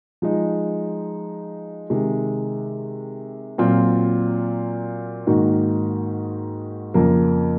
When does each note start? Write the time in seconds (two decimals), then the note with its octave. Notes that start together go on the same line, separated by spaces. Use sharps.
0.22 F3 G#3 D#4
1.90 C3 D#3 G#3
3.58 A#2 F#3 C4 F4
5.27 G#2 D#3 A#3 D#4 F#4
6.94 F2 C#3 F3 A#3